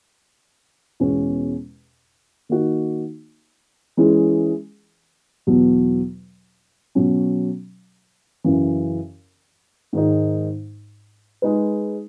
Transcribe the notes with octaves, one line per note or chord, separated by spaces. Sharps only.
E2 B2 G#3 C#4
D#3 A#3 D#4 F#4
E3 G#3 C#4 E4 G#4
E2 B2 F#3
B2 F#3 C#4
F#2 C#3 E3
G#2 D#3 G#3 D#4
G#3 D#4 G#4 B4